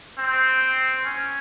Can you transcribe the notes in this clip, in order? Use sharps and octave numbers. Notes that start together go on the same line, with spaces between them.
C4
C#4